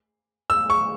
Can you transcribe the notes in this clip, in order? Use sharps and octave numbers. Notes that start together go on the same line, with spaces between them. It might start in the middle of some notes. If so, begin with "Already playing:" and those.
E6
C#6